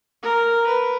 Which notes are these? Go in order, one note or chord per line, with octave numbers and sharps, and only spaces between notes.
A#4
B4